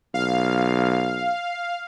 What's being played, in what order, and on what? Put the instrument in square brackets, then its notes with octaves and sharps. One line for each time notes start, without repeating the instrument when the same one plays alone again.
[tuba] B1 [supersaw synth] F5